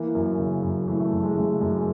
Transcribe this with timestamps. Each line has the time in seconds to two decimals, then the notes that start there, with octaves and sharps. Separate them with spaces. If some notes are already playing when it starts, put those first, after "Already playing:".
Already playing: E3 A#3
0.15 F#2
0.39 C#3
0.63 F#2
0.88 E3 A3
1.00 A3
1.11 F#2
1.23 G#3
1.36 C#3 G#3
1.61 F#2 G#3